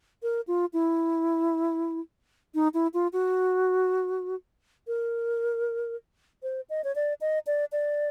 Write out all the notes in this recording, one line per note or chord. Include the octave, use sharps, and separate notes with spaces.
A#4
F4
E4
D#4
E4
F4
F#4
A#4
C5
D#5
C#5
D5
D#5
D5
D5